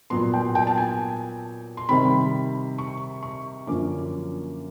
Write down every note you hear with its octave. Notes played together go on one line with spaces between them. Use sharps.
A#2 F#3 B3 C6
G5
G5
A5
G#5
C6
C3 D#3 G3 C4 B5
C#6
C#6
F#2 D3 F3 A#3 C#4 D6